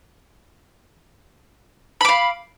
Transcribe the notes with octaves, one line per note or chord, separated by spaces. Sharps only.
F5 B5 D6